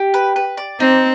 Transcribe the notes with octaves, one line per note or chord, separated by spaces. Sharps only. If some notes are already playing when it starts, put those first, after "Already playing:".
Already playing: G4
B4
B4
D5
C4 D#4